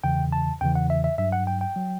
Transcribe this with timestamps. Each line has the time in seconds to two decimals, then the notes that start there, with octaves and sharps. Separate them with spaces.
0.04 E2 C#3 E3 G5
0.32 A5
0.61 E2 C#3 E3 G5
0.75 F#5
0.90 E5
1.04 E5
1.18 G2 F#3 E5
1.32 F#5
1.47 G5
1.61 G5
1.76 F#3